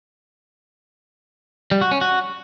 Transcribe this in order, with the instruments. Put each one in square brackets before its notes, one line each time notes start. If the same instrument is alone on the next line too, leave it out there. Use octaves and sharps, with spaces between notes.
[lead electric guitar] G3
F#4
C#4
F#4